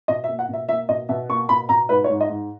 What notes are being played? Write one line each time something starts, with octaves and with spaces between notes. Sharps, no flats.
B2 D#5
E5
A#3
F#5
B2
E5
A#3 E5
B2 D#5
B2 E5
A#3 C#6
B2 B5
B2 A#5
G#2 B4
C#5
G#2
D#5
G#2